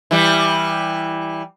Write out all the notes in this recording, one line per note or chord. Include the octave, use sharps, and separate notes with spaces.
E3 G3